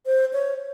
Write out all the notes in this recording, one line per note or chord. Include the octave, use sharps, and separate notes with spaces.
C5
C#5